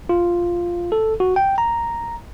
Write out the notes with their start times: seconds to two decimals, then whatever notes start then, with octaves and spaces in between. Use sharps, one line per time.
0.09 F4
0.92 A4
1.20 F#4
1.36 G5
1.58 A#5